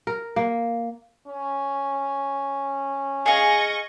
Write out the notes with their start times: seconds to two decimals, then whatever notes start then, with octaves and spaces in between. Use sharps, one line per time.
0.07 A#4
0.36 A#3
1.27 C#4
3.26 G#4 D#5 F5 C#6